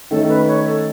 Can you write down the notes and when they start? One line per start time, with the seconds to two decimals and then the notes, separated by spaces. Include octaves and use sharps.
0.11 D#3 A3 C#4 A4
0.29 B4
0.47 C#5
0.65 A4